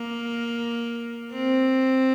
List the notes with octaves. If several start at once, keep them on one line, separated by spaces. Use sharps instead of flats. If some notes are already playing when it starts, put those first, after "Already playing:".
Already playing: A#3
C4